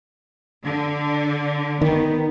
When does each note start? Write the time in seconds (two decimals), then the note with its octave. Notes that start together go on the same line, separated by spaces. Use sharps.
0.65 D3
1.81 D#3 B3